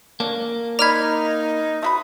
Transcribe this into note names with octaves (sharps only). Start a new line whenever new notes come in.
A#3 C#4 D4
D#4 D5 A#5 B5 F6 G#6
A3 F#4 B5 D#6